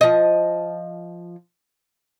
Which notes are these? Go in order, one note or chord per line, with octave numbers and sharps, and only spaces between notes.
F3 D#5